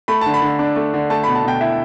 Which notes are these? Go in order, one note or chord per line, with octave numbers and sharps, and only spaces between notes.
A3 B5
D3 A5
B5
D3
D4
A3
D3
A3 A5
B5
B2
A5
B2 G5
E4 E5